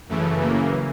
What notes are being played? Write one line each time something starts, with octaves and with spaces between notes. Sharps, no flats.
F#2 C#3 E3 A3
A#3